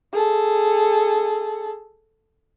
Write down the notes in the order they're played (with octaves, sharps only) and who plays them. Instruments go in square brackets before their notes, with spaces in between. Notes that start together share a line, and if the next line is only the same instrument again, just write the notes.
[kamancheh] G#4 A4